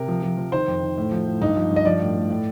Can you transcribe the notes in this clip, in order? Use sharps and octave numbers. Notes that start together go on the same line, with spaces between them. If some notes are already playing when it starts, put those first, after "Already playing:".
Already playing: C3 A#4
F3
F3
F3
D#3 C5
F2
D#3
A2
F3
A2
G2 D#4
F3
G2
D#5
F3 D5
A2
A2
A2